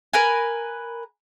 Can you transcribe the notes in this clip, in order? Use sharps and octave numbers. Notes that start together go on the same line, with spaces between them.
A#4 B4 G#5